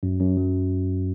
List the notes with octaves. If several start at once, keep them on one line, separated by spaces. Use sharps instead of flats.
F#2
F#2
F#3